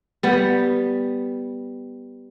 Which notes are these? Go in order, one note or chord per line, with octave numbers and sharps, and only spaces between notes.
G3 B3